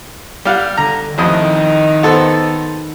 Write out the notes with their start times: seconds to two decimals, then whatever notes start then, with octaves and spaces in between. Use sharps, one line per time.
0.45 G3 F5 F#5
0.77 D3 A#5
1.18 A1 F2 D#3 D#4 D#5
2.03 B3 A4 C5